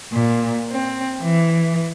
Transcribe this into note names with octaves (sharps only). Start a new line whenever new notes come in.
A#2
C4
E3